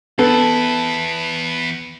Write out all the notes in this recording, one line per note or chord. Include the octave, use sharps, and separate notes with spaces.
E2 B3 E4 A4